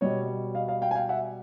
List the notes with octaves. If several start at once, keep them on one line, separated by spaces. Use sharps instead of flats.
B2 G3 C#5 D#5
D#5 F5
D#5 F5
F5 G5
G#5
F5 G5
E5 F#5